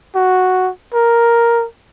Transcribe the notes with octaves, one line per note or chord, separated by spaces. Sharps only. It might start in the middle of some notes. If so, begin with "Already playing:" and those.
F#4
A#4